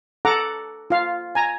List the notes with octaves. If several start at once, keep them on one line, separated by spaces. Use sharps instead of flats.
A4 F#5 A#5 D6
F4 F5
G#5 A#5